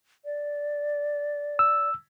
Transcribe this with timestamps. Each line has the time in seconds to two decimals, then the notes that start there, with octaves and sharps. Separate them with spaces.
0.25 D5
1.59 E6